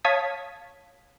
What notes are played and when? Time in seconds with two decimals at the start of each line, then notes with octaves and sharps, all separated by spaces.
0.04 C#5 F5 A5 D#6 G#6 B6